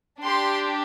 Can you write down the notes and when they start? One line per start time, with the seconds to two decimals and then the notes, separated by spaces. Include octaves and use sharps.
0.21 D4 G4 C6